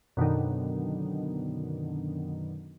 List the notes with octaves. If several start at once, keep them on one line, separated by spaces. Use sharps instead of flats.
F#2 B2 D3 D#3